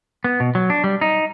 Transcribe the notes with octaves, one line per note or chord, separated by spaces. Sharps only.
B3
B2
F#3
D4
G3
D#4